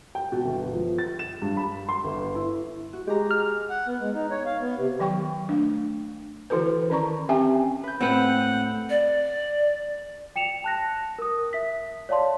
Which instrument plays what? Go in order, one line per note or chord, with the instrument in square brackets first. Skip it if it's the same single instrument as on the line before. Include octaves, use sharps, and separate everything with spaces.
[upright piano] G5
B2
G1
F3
A6
E7
G2
B5
C6
G1
E4
[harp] F#4
[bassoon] G#3 [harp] G4 A#5
[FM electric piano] F6
[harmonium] F#5
B3
G#3
D#4
C#5
F5
B3
C3
[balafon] D#3 F#3 G5 C#6
A3 D4
D3 E3 E4 F#4 A4 B4
D#3 C#4 D5 A#5 C#6
C4 C#4 G4 E5 G5 G#5
[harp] B4 G6
[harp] A2 [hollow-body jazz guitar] C4 B4 [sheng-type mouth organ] F#5
[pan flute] D5
[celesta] G5 C#7 E7 F7
A5 F#6 A#6
A#4 D#6
E5 B6
C#5 D5 F5 A5 C6